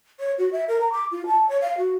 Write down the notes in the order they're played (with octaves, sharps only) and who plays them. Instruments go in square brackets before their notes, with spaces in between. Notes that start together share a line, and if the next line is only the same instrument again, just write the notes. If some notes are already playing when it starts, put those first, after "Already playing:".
[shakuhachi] C#5
F#4
E5
A#4
A#5
D6
F4
A5
C#5
F5
F#4